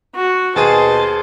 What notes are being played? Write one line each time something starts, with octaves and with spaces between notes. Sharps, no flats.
F#4
D#2 B2 G#4 C5 A5 D#7